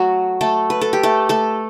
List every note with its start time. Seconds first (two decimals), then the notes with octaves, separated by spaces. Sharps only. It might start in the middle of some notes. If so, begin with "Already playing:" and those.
Already playing: F#3 A3 F#4
0.41 A3 A4
0.70 B4
0.81 A4
0.93 G4
1.03 A3 A4
1.29 A3 A4